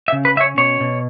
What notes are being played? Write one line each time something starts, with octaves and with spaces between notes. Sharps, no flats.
E5
C#3
B4
C#4 C#5 E5
B2 C#5
B2